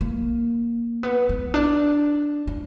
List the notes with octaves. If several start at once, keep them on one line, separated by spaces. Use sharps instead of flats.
A#3
B3
B3
D4
D4